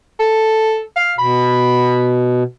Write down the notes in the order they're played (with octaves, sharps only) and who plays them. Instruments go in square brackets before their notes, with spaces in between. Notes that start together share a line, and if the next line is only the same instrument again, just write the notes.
[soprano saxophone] A4
F5
[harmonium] B2 [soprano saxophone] B5